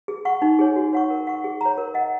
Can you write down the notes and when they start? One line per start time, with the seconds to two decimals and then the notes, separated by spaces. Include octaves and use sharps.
0.08 G#4
0.25 F#5 C#6
0.42 D#4
0.59 G#4 C#5 G#5
0.76 F#4
0.93 C#5 F#5 C#6
1.10 A#4
1.27 F#5 C#6
1.44 G#4
1.61 C#5 A#5
1.78 A#4
1.94 D#5 F#5